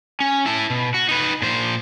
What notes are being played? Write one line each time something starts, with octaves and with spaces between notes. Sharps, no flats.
C#4
E4 A5
B2
F#4
D#4 B4
A#2 C5